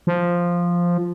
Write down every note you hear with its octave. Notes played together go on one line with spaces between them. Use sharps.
F3